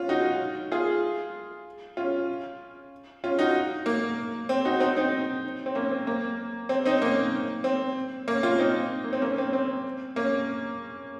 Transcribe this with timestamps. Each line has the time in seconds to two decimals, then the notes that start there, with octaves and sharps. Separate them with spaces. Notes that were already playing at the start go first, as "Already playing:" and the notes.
Already playing: C#4 F4
0.09 D#4 F#4
0.72 F4 G#4
1.97 C#4 F4
3.24 C#4 F4
3.39 D#4 F#4
3.86 A#3
4.49 C4
4.65 D#4 F#4
4.80 C4 D#4
4.96 C4 D#4
5.66 C4
5.75 A#3 C#4
5.91 C4
6.07 A#3
6.69 C4
6.85 C4 D#4
7.01 A#3 C#4
7.64 C4
8.28 A#3 C#4
8.43 C#4 F4
8.59 C4 D#4
9.04 A#3
9.13 C4
9.22 A#3 C#4
9.32 C#4
9.38 C4
9.53 C4
10.16 A#3 C#4